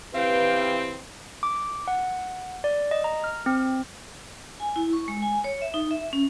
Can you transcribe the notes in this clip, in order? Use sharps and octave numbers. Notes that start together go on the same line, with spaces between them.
E3 C4 G4 B4 F5 G5
D6
F#5
D5
D#5
A#5
F6
C4
G#5
E4
C#6
G#3
G#5
C#5
E5
D#4
E5
C#4